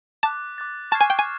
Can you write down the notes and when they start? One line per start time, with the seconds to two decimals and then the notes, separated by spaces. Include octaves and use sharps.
0.23 A5 D6 F#6 A6
0.58 D6 F#6 A6
0.91 A5 C#6 F6 G#6 C7
1.01 G#5
1.10 G5
1.19 G#5